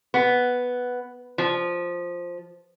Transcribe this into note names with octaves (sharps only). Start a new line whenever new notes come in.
B3
F3